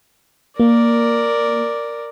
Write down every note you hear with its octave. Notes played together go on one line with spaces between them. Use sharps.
A#3 A#4 D5